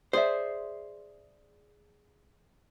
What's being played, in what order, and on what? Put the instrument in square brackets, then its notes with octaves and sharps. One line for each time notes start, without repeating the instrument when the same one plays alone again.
[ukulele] G#4 D5 E5 [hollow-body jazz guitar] C5